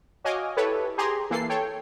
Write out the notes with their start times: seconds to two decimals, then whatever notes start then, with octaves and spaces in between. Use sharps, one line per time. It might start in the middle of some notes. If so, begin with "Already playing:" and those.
0.24 F#4 C#5 D#5 F5 G#5 D6
0.56 E4 G4 A4 B4 C#5
0.98 G4 G#4 G#5 A#5 C6
1.30 E3 A#3 A4 C7
1.49 A4 C#5 G5